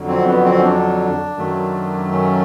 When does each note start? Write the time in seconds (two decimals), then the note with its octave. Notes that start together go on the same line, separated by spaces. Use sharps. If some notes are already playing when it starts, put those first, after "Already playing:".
Already playing: F2 D3 F#3
0.08 C4
0.27 B3
0.45 C4
0.57 C#4
0.64 D4
1.37 F#2 D#3 F#3 A3
2.12 C#4